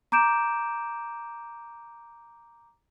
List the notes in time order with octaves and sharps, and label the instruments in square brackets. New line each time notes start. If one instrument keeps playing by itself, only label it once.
[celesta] A#5 D6 G6 D7 E7